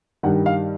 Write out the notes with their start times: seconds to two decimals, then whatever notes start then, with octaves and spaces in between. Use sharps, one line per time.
0.23 G2 D#3 G3 F#5
0.46 F5